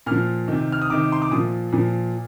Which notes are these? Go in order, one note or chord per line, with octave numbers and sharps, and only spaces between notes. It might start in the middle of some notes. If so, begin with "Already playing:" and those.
A#2 F3 F6
C3 D#3
F6
D#6
C3 D#3 D6
C6
D6
A#2 F3 D#6
A#2 F3